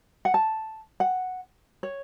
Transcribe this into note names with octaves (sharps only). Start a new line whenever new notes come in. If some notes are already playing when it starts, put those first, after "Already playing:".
F#5
A5
F#5
C#5